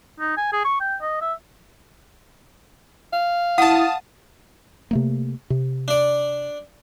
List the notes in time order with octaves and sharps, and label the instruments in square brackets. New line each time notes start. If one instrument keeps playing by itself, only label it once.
[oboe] D#4
G#5
G#4
C#6
G5
D#5
E5
[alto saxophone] F5
[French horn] E4 [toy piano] F#5 [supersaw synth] A5 D#6
[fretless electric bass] C3 A3 A#3
C3
[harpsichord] D4 D5